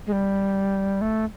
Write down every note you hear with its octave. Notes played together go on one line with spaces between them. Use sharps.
G#3
G3
A3